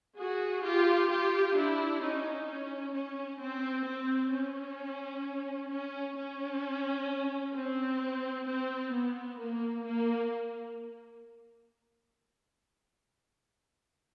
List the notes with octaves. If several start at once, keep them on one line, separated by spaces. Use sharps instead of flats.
F#4 G#4
F4 G4
F4 G4
D4 E4
C#4 D#4
C#4
C#4
C4
C4
C#4
C#4
C#4
C4
C4
B3
A#3
A#3